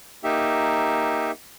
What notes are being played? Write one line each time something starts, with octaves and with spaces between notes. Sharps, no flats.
A#3 D#4 G4 E5